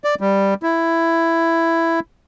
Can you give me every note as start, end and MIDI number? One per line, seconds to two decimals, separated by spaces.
0.04 0.15 74
0.20 0.54 55
0.63 2.00 64